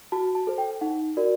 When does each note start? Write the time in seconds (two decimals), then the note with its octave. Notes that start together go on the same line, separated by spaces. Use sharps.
0.12 F#4 A5
0.35 A5
0.47 A4 C5
0.58 G5
0.81 D#4 F#5
1.17 F#4 A#4 D5